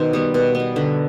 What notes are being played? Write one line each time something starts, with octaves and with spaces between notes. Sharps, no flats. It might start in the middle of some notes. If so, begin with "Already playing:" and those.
Already playing: B2 D#3 C5
G3 B3
B2
B3
G3
D3 B4